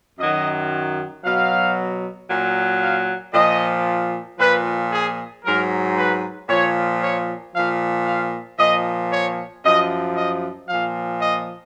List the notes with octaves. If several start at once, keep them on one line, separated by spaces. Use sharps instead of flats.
F#2 D#3 F#3 D#5
B2 F#3 F5
A#2 F#3
F5
A#2 F3 D#5
A#2 F3 B4
G#4
G#2 F#3 A#4
B4
A#2 F3 C#5
C#5
A#2 F3 F5
F5
A#2 F3 D#5
C#5
F#2 F3 D#5
D#5
A#2 F3 F5
D#5